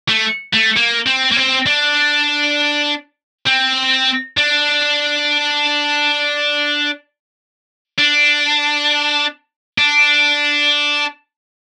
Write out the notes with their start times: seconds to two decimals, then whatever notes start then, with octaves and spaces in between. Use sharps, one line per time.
0.09 A3
0.53 A3
0.76 A#3
1.06 C4
1.31 A#3
1.36 C4
1.66 D4
3.47 C4
4.37 D4
7.99 D4
9.78 D4